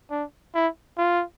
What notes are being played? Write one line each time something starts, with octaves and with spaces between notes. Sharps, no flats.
D4
E4
F4